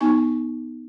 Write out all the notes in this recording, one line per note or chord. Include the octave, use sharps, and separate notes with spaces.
B3 D#4 G#5 C#6